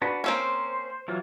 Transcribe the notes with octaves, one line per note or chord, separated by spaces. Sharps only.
D4 F#4 B4
A#3 C4 C#4 C5
E3 F#3 F4